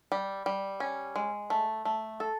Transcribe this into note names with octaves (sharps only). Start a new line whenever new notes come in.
G3
G3
C#4
G#3
A3
A3
A4